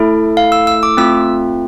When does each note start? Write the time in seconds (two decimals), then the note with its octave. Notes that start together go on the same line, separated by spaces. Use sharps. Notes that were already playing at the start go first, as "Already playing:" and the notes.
Already playing: A3 E4 A4
0.37 F5
0.52 E6
0.67 E6
0.83 D6
0.97 A3 C4 F4 E6